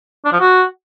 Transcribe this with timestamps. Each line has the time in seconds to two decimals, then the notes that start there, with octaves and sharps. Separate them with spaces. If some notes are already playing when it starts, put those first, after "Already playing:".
0.25 D4
0.33 F3
0.40 F#4